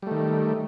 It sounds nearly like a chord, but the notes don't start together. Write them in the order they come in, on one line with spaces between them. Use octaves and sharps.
G3 A3 D#3